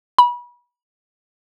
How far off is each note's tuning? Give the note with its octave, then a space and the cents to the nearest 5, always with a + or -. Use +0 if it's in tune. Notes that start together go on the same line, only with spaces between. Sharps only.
B5 -30